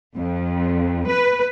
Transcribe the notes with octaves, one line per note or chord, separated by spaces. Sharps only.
F2
B4